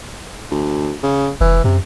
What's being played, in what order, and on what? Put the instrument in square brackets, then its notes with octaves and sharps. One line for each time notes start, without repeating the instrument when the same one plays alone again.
[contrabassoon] D2
C#3
[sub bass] F1 [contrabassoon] E3
[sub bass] F#2 [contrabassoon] C3